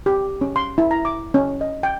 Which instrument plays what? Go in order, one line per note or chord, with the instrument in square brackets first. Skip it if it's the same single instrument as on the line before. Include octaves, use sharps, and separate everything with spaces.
[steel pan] G4
C#4
C6
E4
A#5
D6
C#4
D#5
G5